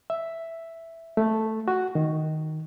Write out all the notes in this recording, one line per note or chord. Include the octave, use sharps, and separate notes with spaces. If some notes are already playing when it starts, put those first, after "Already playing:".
E5
A3
F#4
D#3